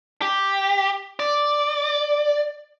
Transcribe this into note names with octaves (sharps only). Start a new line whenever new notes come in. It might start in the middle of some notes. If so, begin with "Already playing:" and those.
G4
D5